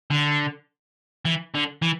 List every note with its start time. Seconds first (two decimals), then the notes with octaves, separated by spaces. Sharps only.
0.11 D3
1.25 E3
1.54 D3
1.82 E3